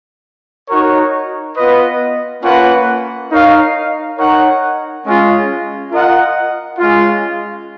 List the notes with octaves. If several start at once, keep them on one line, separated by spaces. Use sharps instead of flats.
D#4 F#4 A#4 C#5
B3 F4 B4 D#5
A#3 C#4 F4 B4 F#5
D#4 A#4 C#5 F5
D#4 A#4 C#5 F#5
G#3 C#4 F4
F4 A#4 D#5 F#5
G#3 C#4 F4